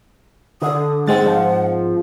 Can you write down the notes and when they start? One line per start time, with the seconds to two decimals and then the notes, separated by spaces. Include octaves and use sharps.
0.62 D3 D#6
1.07 G#2 G#3 C4 F#5 A6
1.26 F3